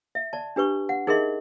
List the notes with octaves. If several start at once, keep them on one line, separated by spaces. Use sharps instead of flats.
E5
D5 A5
D4 G4 B4 C#6
F#5
D#4 G#4 A#4 D#5 E5 C6